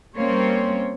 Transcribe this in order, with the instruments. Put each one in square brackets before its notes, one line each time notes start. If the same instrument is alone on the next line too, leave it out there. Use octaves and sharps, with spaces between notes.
[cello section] G3 A#3 C4 C#4 C5 C#5